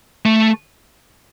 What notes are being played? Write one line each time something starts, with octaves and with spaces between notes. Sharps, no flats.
A3